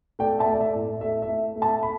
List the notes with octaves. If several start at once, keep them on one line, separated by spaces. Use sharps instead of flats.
A3 D5 G5
E5 A5
A3
D5
E5
A2
D5
A3 E5
E5
A3
A3
E5 A5
B5